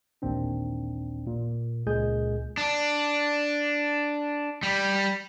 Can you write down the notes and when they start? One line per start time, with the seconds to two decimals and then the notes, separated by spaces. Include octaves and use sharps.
0.22 A1 D#2 A#2 C4 D4
1.27 A#2
1.86 C#2 A#2 G#3 G#4 G#5 G6
2.57 D4
4.63 G3